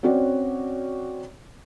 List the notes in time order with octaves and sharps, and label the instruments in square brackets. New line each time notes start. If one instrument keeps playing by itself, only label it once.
[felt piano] C4 C#4 F#4 C#5 D5